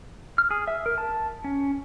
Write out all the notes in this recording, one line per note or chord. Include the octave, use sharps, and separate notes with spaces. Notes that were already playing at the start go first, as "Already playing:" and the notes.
F6
G#4
E5
A#4
A5
C#4